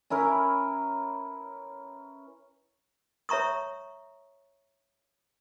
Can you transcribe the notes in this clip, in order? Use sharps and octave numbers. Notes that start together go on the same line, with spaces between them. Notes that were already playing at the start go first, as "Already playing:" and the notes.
C#4 E4 A#4 B4
C#5 E5 A#5 C#6 D#6